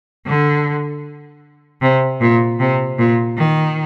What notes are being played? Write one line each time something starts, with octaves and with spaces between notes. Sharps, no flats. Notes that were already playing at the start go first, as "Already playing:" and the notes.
D3
C3
A#2
C3
A#2
D#3